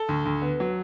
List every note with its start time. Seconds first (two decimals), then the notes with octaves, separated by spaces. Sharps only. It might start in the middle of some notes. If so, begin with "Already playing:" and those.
Already playing: A4
0.09 D2
0.25 D2
0.42 B3
0.60 F#3